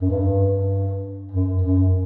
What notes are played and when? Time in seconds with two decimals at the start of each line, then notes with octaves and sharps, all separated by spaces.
0.02 F#2
0.10 G2
1.31 F#2
1.62 F#2